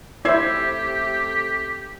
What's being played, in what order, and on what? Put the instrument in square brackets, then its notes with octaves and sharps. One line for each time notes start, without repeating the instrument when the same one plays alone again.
[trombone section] C3 A3 [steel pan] E4 C5 [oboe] G4 [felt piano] E6 G#6 C7